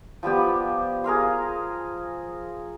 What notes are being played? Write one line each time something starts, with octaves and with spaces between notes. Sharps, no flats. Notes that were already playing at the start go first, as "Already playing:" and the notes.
F3 G3 B3 G4
G#4 A#4 F5 C6